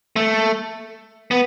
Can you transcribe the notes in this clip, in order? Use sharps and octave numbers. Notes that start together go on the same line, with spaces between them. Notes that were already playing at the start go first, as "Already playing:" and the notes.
A3
B3